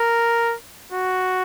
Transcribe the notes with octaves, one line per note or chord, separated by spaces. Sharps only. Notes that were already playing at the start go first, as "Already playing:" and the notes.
Already playing: A#4
F#4